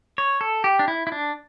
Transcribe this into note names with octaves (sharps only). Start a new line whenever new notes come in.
C#5
A4
G4
D4
E4
E4
D4